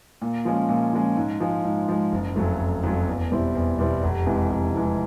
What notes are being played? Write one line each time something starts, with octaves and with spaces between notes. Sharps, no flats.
A#2
F3 G#3 C#4
A#2
F3 G#3 C#4
G#2
F3 G#3
G#2
F3 G#3
F#1
F2 C#3 F#3 A3
F#1
F2 C#3 F#3 A3
E2
B2 G3 C4 E4
E2
B2 G3 C4 E4
F1
F2 C3 E3 G#3
F1
F2 C3 E3 G#3